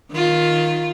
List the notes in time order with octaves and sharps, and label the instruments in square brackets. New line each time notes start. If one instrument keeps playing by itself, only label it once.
[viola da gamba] D#3 F4